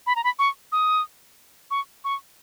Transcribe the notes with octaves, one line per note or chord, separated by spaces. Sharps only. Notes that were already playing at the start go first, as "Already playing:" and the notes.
B5
A#5
B5
C#6
D#6
C#6
C#6